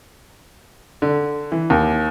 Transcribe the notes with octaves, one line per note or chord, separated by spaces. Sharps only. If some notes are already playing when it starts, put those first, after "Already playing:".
D3
E3
D#2